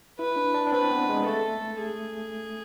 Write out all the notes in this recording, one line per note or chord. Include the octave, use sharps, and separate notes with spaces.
E4 B4
D4
D4
D4
C4 B4
B3
G#3
A3 A4
G#4